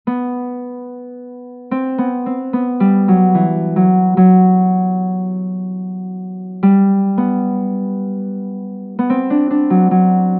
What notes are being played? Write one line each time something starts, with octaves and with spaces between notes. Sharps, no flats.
B3
C4
B3
C4
B3
G3
F#3
E3
F#3
F#3
G3
B3
B3
C4
D4
D4
F#3
F#3